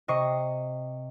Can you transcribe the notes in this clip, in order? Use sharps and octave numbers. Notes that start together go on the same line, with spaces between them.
C3 D#5 C#6 C7